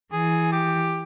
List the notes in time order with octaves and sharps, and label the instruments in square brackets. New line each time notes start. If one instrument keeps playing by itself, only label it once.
[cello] E3 [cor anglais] G#4
[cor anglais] G4